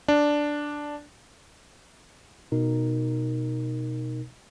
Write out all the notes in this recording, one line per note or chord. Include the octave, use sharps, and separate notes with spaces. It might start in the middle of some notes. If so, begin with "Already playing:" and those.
D4
B2 D#4 A#4